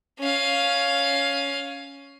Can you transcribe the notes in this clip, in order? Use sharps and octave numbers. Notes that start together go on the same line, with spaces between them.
C#4 F5